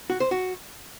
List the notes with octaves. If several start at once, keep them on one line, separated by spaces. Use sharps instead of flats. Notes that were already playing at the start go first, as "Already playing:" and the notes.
F#4
C5
F#4